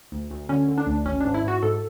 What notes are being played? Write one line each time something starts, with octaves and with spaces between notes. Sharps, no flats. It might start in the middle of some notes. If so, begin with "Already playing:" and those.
D2
D2
D3 C#4
D3
D4
D2
G#1 C#4
G#2 D4
E4
G#2 F#4
G#2 A4